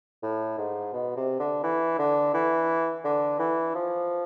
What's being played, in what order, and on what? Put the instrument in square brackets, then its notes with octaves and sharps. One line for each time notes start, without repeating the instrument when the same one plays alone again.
[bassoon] A2
G#2
B2
C3
D3
E3
D3
E3
D3
E3
F3